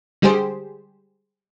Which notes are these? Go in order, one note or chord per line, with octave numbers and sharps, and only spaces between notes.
D3 G3 G#3 G4 G#4 C5